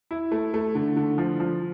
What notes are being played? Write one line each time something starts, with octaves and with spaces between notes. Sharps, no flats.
E4
A3
A3
D3
D3
F3
F3